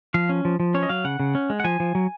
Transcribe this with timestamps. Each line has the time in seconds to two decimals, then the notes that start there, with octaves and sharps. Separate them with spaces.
0.14 F3 F5
0.29 C#4
0.45 F3
0.60 F3
0.74 C#4 C#5
0.83 D#5
0.89 F#3 F5
1.04 C#3 F#5
1.20 C#3
1.35 C#4
1.50 G#3
1.60 F#5
1.64 F3 G#5
1.80 F3
1.95 F#3